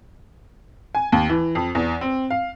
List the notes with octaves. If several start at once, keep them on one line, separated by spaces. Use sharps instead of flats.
G#5
D#2
E3
F2
E2
C4
F5